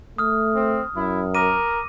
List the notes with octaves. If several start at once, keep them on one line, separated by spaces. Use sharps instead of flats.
A3 D#6 F6
C4
F#2 E4
A#4 D6 A#6 D#7